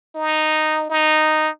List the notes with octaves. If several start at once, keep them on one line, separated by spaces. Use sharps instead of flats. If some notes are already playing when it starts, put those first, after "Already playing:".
D#4
D#4